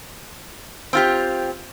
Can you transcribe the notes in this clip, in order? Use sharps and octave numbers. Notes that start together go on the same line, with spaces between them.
C4 F4 G4